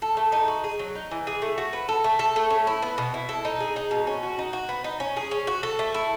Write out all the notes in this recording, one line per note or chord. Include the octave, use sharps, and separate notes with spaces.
A4
A3
D#4
F#4
G#4
F#3
D#4
E3
G#4
A3
F#4
B4
A4
A3
A4
A3
C#4
E4
B3
B2
E4
A4
D#4
G#4
D#4
B2
C#4
F#4
D#4
F#4
B3
D#4
C#4
G#4
C#4
F#4
A4
A3
E4